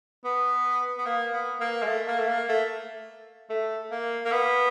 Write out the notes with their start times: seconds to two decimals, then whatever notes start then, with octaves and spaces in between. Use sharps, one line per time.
0.25 B3
0.98 B3
1.06 A#3
1.33 B3
1.60 A#3
1.82 G#3
1.87 A3
2.08 A#3
2.19 A3
2.28 A#3
2.49 A3
3.50 A3
3.91 A#3
4.25 A#3
4.32 B3